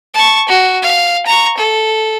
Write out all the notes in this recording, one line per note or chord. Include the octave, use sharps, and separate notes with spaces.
A5 C#6
F#4
F5
A#5 C#6
A4